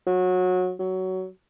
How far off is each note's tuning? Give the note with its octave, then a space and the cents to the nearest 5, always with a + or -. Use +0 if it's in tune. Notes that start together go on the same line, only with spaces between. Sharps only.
F#3 -20
F#3 +15